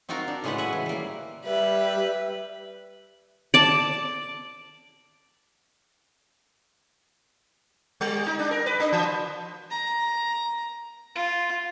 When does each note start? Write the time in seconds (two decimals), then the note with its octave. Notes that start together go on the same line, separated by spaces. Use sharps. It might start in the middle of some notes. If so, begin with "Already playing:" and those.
0.09 C4 D#4 F4 F#4 A#4
0.28 D4
0.44 A2 C#3 G#3 C#4 B4 F#5
0.58 E5 F#5 G#5
0.73 E3
0.86 G3 A#3
1.45 G3 B4 E5
3.54 D5 A5
8.01 G3
8.27 D#4
8.39 D4
8.51 A#4
8.66 B4
8.80 D4
8.92 E3
9.71 A#5
11.16 F4